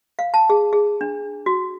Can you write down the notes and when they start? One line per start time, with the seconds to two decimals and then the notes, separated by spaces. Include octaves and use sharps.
0.19 F5
0.34 A5
0.50 G#4
0.73 G#4
1.01 D4
1.46 F#4